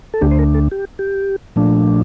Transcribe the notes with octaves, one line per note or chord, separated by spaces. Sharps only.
A4
D2 D3 A3 D4 G4
C5
A#4
A4
G4
G4
A#2 F3 A3 D4